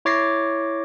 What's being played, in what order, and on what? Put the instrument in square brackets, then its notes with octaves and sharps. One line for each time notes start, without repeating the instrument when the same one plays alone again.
[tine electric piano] E4 C#5 D6 A6 A#6 C7